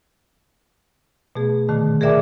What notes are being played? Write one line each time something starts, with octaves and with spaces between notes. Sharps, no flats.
B2 A3 B3 G#4
A#2 D3 D#3 A3
G#4 A#4 D5 E5 G5 D6